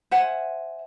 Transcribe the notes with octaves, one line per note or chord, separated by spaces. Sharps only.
C5 E5 F#5 G#5